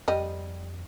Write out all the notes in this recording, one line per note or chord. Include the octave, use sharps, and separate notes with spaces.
F2 G3 D#5